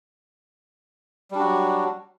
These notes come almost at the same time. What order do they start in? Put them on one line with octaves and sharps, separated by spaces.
G3 D4 F#4 F#3